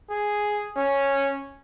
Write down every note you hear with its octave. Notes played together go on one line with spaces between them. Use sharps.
G#4
C#4